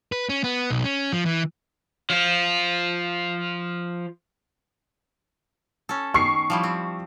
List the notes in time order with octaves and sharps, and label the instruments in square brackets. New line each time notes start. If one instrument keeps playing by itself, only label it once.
[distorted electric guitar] B4
C#4
B3
B1
C#4
F3
E3
[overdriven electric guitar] F3 F4
[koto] C#4 A4
[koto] D#3 [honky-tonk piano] C#6 C7
[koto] F3 G3 E4
C4